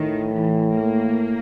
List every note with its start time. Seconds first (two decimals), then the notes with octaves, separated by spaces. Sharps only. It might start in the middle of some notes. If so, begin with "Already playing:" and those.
Already playing: A2 D#3
0.34 E3
0.81 A#3